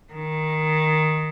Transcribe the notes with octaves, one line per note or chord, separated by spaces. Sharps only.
D#3